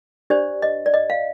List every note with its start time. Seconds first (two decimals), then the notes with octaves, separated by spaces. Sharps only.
0.30 D4 G4 C5 D5
0.62 D#5
0.86 D5
0.94 D#5
1.10 F5